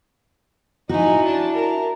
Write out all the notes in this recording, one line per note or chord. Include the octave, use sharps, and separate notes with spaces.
D#4 E4 F#4 G#5
D4 A5
A#4